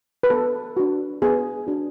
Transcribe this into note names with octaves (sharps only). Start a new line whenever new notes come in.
B4
B3 A4
D4 F#4
B3 G#4
D4 F#4